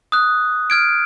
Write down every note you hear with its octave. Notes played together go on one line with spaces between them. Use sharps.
D#6 F#6
F6 G#6 D7